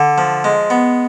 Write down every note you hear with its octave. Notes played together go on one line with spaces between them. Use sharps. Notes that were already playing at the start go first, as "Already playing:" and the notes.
Already playing: D3
F3
G#3
B3